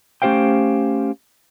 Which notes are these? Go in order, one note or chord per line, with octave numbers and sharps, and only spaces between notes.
A3 C#4 G4 C5 F5 G5